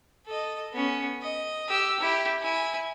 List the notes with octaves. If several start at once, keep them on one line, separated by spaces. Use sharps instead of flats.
A4 D#5
B3 C#4
D#5
G4 E6
E4 G4
E4 G#5